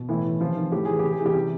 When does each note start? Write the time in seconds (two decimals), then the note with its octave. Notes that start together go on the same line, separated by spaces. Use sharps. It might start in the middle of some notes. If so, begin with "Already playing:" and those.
Already playing: B2
0.08 A2 E3 E4
0.25 E3
0.40 C3 F3 F4
0.56 D#3
0.72 A2 G4
0.85 E3 G#4
0.99 C3 G4
1.12 G#4
1.20 E3
1.25 G3 G4
1.35 C3